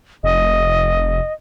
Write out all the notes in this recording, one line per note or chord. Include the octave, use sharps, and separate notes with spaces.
F1 D#5